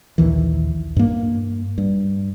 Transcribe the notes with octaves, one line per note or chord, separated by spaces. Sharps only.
A#1 D#2 D#3 E3
G2 A#3
G2